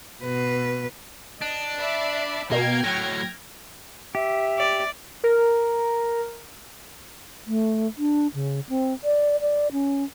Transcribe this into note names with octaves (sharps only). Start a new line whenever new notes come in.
B2 B4
D4 D#5
D5 E5 B5
B2 A#3 G5 F6 G#6
A2 F#3 A#6
G4 E5
D5
A#4
A3
D4
C#3
C4
D5
D5
C#4